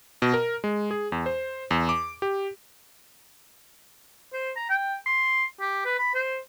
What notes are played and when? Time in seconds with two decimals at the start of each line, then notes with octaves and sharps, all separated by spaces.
0.22 B2
0.34 A#4
0.64 G#3
0.91 G#4
1.12 E2
1.26 C5
1.71 E2
1.89 D6
2.22 G4
4.33 C5
4.56 A#5
4.69 G5
5.06 C6
5.61 G4
5.86 B4
5.99 B5
6.15 C5